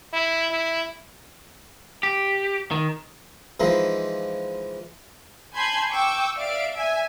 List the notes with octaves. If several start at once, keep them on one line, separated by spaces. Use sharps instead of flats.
E4
E4
G4
D#3
E3 F3 G#3 D#4
G#5 A5 B5 C6 G6 G#6
G5 C#6 D6 E6
D5 E5 F5 D7
E5 G#5